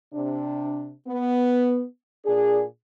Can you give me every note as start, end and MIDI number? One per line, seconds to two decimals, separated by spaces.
0.14 0.92 48
0.14 0.92 62
1.08 1.83 59
2.26 2.62 46
2.26 2.62 62
2.26 2.62 68